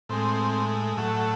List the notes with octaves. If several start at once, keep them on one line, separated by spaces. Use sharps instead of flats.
A2 G#3 C4
A2 F#3 A3